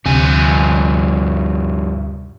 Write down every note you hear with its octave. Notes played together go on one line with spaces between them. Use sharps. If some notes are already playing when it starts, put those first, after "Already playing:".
D2 G2 C3 F3 G#5